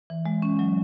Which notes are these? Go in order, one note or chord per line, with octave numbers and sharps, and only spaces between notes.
E3
G#3
C#4
F#3